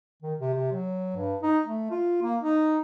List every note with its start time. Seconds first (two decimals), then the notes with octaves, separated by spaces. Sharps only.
0.22 D#3
0.39 C3
0.54 C3
0.72 F#3
1.16 G2
1.43 D#4
1.65 A3
1.90 F4
2.22 A#3
2.41 D#4